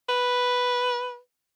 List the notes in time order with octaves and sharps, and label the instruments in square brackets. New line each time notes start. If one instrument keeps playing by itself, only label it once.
[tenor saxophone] B4